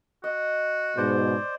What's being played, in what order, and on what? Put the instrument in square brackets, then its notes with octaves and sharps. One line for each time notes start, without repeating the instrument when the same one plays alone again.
[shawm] F#4 [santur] D#5
[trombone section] G#2 B2 [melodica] C5 D5